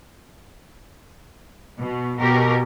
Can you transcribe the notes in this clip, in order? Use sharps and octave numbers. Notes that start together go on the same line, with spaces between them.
B2
B2 G4 A#4